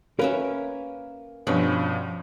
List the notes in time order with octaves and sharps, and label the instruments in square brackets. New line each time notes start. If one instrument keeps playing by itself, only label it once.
[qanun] A#3 C#4 E5 [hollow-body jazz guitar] A#4 B4
[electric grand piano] G2 B2 [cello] F3 [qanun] C#4 B5 C#6